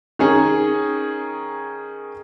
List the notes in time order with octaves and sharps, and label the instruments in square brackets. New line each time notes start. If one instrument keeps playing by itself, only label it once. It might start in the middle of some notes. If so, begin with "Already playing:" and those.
[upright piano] D#3 C#4 G#4